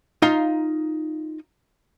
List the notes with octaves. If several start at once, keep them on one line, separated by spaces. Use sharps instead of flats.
D#4 F4 F5 A#5